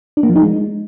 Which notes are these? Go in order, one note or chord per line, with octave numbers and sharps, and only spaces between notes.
D4
A#3
F3
D#4
G#3